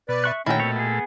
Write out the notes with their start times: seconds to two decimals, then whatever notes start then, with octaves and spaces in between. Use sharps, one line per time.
0.09 B2 B4 D5
0.24 E5 C#6 F#6
0.46 A#2 D#3 A3 C#4 E4 F#4 G5
0.59 B2 C4 C#5 E5
0.76 B3 G#4